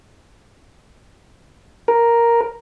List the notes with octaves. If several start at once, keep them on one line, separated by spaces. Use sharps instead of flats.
A#4